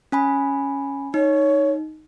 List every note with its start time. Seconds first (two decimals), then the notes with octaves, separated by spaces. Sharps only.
0.12 C#4 G#5 B5
1.14 D#4 C#5